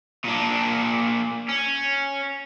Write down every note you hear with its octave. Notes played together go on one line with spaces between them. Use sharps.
A#2 D4
C#4